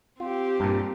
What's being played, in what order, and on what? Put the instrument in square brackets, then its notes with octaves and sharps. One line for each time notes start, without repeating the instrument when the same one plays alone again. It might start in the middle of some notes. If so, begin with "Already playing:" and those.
[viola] C4 G4 [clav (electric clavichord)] F4
[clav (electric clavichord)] G2 A#2